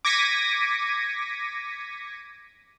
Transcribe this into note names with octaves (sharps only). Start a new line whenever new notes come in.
D6 G#6 A#6 B6 C#7 D#7